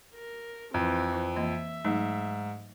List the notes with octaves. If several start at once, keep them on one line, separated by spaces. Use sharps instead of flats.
A#4
F2 E3 C4
E3 A#3 D#5 E5
G#2 F#3 A3 D#4